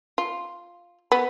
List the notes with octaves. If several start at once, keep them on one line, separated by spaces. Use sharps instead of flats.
F4
B3